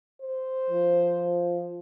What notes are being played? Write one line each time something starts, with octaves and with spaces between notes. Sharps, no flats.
C5
F3